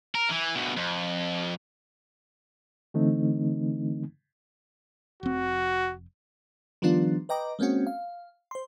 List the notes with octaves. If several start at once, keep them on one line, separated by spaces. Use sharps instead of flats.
A#4
E3
D2 B2
F2
D3 E3 A3 C4 D#4
F1 C4 F#4
D#3 F3 G3 B3 D4 F4
B4 D#5 G5 A#5 D6
G#3 A#3 C4 C#4 F#4
F5
C5 C6